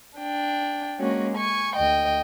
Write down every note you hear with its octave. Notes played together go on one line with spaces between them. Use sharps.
D4 G5
G#3 A#3 C#4 F#4
G#5 C#6
D2 D#5 G5